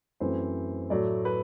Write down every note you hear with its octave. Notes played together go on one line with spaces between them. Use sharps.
F#2 E3 A3 C4 C5
A2 F#3 A3 D5
B4